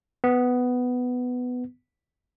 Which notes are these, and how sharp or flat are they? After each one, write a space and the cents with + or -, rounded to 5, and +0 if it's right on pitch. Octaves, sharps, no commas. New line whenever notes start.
B3 +10